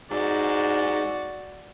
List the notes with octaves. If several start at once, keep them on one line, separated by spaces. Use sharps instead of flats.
G#2 F#4 D5